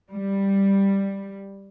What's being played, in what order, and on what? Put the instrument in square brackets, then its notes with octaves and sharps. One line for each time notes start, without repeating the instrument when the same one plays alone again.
[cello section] G3